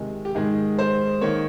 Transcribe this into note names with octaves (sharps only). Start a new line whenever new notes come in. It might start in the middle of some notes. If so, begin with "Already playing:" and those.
Already playing: C3 D#3 G#3
G4
G#2 D#3 G#3 G#4
C5
D#3 A#3 C#5